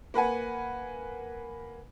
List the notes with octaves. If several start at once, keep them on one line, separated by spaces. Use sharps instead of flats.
A#3 B4 F#5 G#5